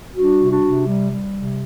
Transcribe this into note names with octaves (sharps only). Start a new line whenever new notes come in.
G3 D4 F#4
C3
D4 F#4
C3
G3
G3
C3